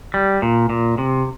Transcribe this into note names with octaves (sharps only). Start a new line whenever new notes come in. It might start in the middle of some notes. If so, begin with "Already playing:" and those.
G3
A#2
A#2
C3